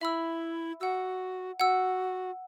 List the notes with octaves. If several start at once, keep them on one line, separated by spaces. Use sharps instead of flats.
E4 E5 B5 E6
F#4 F#5 E6
F#4 F#5 E6